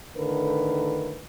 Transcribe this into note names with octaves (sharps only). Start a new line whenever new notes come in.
A2 D3 D#3 A#4 B4